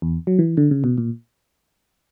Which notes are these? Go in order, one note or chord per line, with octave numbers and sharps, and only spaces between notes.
E2
F#3
E3
D3
C#3
B2
A#2